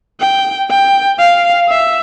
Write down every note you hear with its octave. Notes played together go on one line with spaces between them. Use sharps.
G5
G5
F5
E5